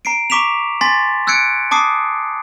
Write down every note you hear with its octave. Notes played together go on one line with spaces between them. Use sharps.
A#5 C7 D7
A#5 C#6 D6 B6 E7 F7
G#5 C6 A6 B6
E6 F#6 G#6 C#7 D7
A5 D6 D#6 C7